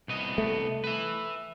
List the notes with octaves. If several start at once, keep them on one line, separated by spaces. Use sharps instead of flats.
C2 B3 D#5
A3
B4 E5